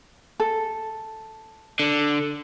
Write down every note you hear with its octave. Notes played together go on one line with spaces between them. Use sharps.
A4
D3